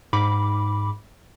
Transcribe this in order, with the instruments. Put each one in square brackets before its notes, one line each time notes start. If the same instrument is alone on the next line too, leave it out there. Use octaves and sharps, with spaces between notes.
[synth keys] G#2 B5 D6